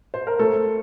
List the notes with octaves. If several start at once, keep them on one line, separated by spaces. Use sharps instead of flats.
C5
A#4
A3 A4